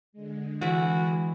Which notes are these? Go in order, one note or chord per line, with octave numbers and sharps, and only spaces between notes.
D3 G#3
E3 F#4 E5